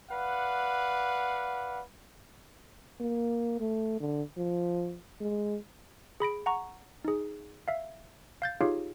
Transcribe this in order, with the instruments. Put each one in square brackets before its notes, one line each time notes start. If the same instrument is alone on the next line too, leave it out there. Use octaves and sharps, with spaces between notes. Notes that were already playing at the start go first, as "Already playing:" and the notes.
[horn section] B4 D5 F5 F#5
[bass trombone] A#3
A3
D3
F3
G#3
[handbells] G#4 B5 A#6 D7
F#5 A#5 C#6
D#4 G#4
E5 F5
F5 G6 A6
D#4 F4 G4 G#4 C#5 F5